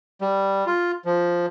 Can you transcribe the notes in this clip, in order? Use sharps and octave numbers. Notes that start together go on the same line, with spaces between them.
G3
F4
F3